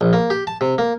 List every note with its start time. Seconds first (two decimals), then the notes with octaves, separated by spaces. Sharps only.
0.01 A#1
0.13 A#3
0.30 G4
0.47 A5
0.61 C3
0.78 A#3